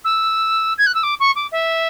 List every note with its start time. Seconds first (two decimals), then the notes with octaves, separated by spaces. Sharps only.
0.04 E6
0.78 G#6
0.86 F#6
0.94 E6
1.03 D6
1.20 C#6
1.35 D6
1.51 E5